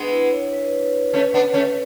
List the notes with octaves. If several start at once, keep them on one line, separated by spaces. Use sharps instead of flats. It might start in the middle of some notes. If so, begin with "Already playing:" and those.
Already playing: G#3 B3 D4
E4
C#5
B4
B4
A3 C#4 B4
B3 D4
A3 C#4